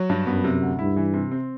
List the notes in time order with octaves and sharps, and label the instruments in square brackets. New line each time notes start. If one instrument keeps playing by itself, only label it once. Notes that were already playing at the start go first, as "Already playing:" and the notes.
Already playing: [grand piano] F#3
G2
[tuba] F#2 [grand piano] B3
[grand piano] C3
D2
[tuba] G2 [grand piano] E4
[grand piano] E3
C3
C4